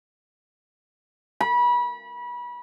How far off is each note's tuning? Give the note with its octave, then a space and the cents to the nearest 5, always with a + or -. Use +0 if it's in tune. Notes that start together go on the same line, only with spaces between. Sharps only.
B5 -30